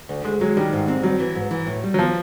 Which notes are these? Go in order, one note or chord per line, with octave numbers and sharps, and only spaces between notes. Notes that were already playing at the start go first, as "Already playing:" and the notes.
D2
D2 G#3
F#3 G#3
D#3 G3
G#2
C4
F#3 G3
E3
G#2
E3
A2
G3
F#3
F3 B3